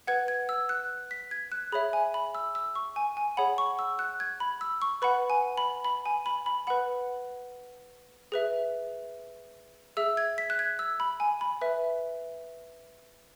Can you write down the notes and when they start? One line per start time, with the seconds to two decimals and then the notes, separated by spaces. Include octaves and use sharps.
0.07 B4 F#5 G#6
0.28 G#6
0.49 E6
0.69 F#6
1.11 B6
1.31 G#6
1.52 F#6
1.72 G#4 C#5 E5 B5
1.93 G#5
2.14 B5
2.35 E6
2.55 E6
2.75 C#6
2.96 G#5
3.17 G#5
3.37 G#4 C#5 F#5 B5
3.58 C#6
3.79 E6
3.99 F#6
4.20 G#6
4.40 B5
4.61 E6
4.82 C#6
5.02 B4 F#5 B5
5.30 G#5
5.57 B5
5.85 B5
6.06 G#5
6.26 B5
6.46 B5
6.67 B4 F#5 B5
8.32 G#4 B4 E5
9.97 G#4 E5 E6
10.17 G#6
10.38 B6
10.50 F#6
10.59 G#6
10.79 E6
11.00 B5
11.20 G#5
11.41 B5
11.61 B4 E5